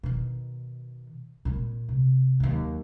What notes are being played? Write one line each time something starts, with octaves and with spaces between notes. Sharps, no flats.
B2 D#3
A#2 G#3
C3
D#2 F#3